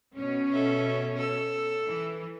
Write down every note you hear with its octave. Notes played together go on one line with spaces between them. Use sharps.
B2 C#4
A4 E5
A4 E6
E3